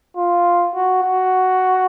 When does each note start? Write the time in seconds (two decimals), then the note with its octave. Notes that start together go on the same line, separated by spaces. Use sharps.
0.17 F4
0.75 F#4
1.03 F#4